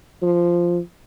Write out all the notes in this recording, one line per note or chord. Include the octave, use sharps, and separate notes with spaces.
F3